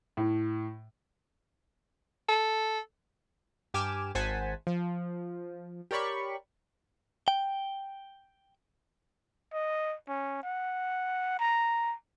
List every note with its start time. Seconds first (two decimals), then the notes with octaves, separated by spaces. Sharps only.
0.17 A2
2.29 A4
3.74 G2 G4 G#5 D6 F6 E7
4.15 G#1 C5 F#5 G#5 A5 B6
4.67 F3
5.91 G4 A#4 C#5 D5 B5 C#6
7.28 G5
9.53 D#5
10.08 C#4
10.43 F#5
11.39 A#5